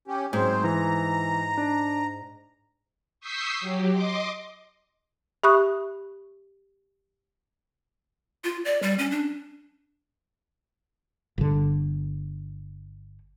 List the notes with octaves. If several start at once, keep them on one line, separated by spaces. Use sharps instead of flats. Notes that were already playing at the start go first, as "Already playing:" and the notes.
C#4 G4
G#2 F#3 C4 C5
E3 A#5
D4
C#6 D#6 E6 G6 B6 C7
F#3 G4
D#5 C6 D6
G4 E5 B5 C#6 D#6 F#6
F4
D5
G3
C#4
D4
G1 D3